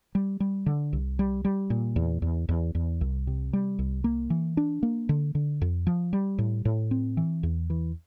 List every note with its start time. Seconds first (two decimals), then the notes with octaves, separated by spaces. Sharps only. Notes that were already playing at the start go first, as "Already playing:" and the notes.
0.15 G3
0.40 G3
0.66 D3
0.93 C2
1.19 G3
1.45 G3
1.70 A#2
1.96 E2
2.22 E2
2.49 E2
2.75 E2
3.01 C2
3.27 C3
3.53 G3
3.79 C2
4.04 A#3
4.30 E3
4.57 D4
4.83 A#3
5.09 D3
5.35 D3
5.61 F2
5.87 F3
6.13 G3
6.38 A2
6.65 A2
6.91 C4
7.17 E3
7.43 E2
7.70 E3